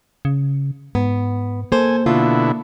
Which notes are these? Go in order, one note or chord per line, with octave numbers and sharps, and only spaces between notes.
C#3
G#2 B3
A#3 A4 C5 G#5
B2 D3 E4 F4